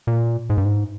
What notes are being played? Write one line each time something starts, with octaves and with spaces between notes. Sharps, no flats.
A#2
G#2
G2
G#2